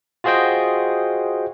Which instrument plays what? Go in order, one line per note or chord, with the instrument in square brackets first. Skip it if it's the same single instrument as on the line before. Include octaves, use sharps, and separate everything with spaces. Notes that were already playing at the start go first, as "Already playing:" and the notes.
[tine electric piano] F4 F#4 G#4 C5 D#5 G5